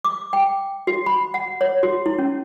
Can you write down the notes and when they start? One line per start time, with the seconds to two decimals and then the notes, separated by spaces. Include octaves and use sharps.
0.05 D6
0.33 G5
0.87 F#4
1.06 B5
1.34 F#5
1.61 C#5
1.83 F#4
2.06 E4
2.19 C#4